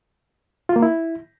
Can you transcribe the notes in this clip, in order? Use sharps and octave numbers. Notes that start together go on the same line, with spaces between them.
F4
A#3
E4